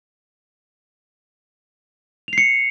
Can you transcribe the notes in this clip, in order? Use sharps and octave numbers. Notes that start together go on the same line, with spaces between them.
C7 C#7 F7